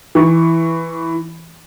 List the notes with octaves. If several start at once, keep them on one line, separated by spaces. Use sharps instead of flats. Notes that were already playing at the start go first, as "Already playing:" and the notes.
E3 C#6